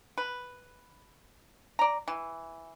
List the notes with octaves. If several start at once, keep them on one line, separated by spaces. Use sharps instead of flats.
B4
D5 A#5
E3